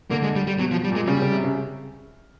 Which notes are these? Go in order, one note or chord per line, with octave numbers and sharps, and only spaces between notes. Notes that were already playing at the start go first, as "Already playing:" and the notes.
D3 A#3
G#3
G3
G3
B2 F#3
F3
G3
A#2 G#3
C#3 G3
C#3
C3
C#3